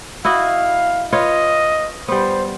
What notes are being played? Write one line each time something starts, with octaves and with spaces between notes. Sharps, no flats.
E4 F#4 D#5 F5
F4 B4 C#5 D#5
G3 B3 C5